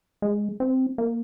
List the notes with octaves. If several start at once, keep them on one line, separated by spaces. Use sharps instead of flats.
G#3
C4
A#3